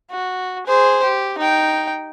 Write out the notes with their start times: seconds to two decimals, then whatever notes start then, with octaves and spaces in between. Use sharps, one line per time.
0.11 F#4
0.67 G#4 C5
1.03 G4
1.38 D#4 G5